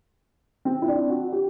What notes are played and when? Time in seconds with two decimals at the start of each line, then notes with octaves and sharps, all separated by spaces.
0.65 C4
0.82 E4
0.88 D4
1.10 F#4
1.32 G4